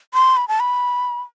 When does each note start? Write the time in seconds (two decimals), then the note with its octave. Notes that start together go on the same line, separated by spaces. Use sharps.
0.14 C6
0.37 B5
0.48 A5
0.60 B5